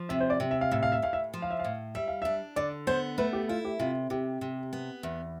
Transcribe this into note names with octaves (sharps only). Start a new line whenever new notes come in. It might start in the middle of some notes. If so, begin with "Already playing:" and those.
Already playing: F3
C3 E5
C5
D5
C3
E5
F5
A2 E5
F5
E5
A2 F5
E5
F3
F5
E5
F5
A2
G3 E5
F5
D4 E5
D3 D5
B3 C5
A3 B4
G4
E4 F4
G4
C3 F4
C3 G4
C3
B3
E2